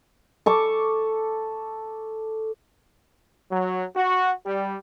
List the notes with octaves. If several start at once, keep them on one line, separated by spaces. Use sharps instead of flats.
A4 C#6 D6
F#3
F#4
G3